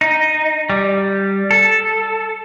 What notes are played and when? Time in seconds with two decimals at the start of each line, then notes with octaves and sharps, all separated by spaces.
0.01 D#4
0.70 G3
1.51 A4